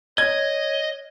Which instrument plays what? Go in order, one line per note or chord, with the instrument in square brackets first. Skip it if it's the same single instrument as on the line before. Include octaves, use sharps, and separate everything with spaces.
[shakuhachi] C#5 [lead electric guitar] D#5 [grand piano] G#6